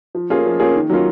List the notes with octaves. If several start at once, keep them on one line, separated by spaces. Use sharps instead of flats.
F3
A#3 C#4 F4 G#4
F3
A#3 C#4 F4 G#4
D#3
F#3 A#3 C#4 F4